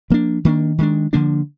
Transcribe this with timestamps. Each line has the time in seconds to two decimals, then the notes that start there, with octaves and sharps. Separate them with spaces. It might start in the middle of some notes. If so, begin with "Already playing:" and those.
0.10 F3 A#3 D4
0.45 D#3 A#3 D4
0.78 D#3 G#3 D4
1.13 D3 F3 A#3 D4